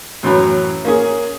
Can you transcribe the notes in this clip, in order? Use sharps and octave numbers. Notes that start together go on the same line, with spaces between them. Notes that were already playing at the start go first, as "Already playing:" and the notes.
F#2 A2 E3 F#3 B5
A#3 C#4 G#4